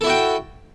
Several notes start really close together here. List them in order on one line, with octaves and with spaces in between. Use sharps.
A4 E4 F#4 G5